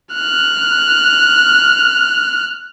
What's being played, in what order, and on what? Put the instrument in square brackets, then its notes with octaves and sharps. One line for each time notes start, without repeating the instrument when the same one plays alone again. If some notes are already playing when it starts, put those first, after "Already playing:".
[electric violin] F6 F#6